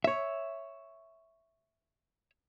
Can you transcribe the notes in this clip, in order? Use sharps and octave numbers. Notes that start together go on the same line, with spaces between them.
C#5 E5